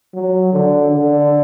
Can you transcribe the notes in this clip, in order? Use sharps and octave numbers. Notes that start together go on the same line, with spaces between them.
F#3
D3
D3